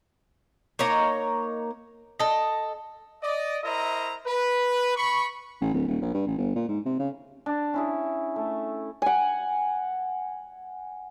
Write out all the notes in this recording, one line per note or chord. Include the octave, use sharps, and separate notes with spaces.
A#3 D#4 C#5 A#5
A4 D#5
D5 D#5
E4 A#4 C5 D#5 E5 A#5
B4
B5 C#6
A1
D1
D#1
A#1
G2
A1
G1
A#2
G#2
C3
C#3
D4
C#4 E4 G#4
A3
F#5 G#5